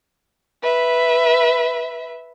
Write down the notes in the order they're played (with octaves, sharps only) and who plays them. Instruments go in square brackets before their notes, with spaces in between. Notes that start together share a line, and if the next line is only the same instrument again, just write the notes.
[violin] B4 E5